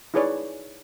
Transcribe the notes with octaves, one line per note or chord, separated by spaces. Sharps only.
D#4 E4 G#4 B4 C#5 D5